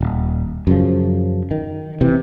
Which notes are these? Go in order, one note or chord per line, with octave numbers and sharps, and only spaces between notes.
D#1
F#2 C#3 F3
D#3
C3 E3